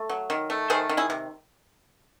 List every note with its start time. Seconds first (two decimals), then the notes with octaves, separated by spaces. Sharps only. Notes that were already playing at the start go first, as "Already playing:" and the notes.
Already playing: A3
0.09 F#3
0.30 D#3
0.50 A3
0.70 D#3 G#4 C5
0.89 D#3
0.97 E4 G#4
1.10 C3